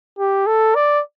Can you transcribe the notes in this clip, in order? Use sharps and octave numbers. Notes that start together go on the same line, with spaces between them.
G4
A4
D5